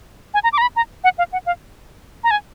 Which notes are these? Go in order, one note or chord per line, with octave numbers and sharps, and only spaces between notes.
G#5
A#5
D6
A#5
B5
A#5
F#5
F5
F#5
F5
A#5
G#5